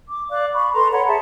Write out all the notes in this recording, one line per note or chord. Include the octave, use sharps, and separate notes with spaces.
D6
D5 F5 D6 F#6
B5 C#6
A4 B4 A#5 C6
C#5 F#5 A#5 B5
G#4 E5 A5